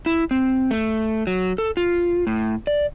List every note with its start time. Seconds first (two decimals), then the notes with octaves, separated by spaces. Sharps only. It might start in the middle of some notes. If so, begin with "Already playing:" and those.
0.06 E4
0.31 C4
0.71 A3
1.27 F#3
1.58 A4
1.77 F4
2.27 A2
2.67 D5